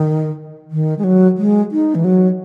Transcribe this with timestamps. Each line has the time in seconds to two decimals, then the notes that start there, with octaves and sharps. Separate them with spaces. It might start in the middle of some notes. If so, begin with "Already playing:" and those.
Already playing: D#3
0.71 D#3
0.98 G#3
1.04 F#3
1.38 G#3
1.72 D#4
1.95 E3
2.04 F#3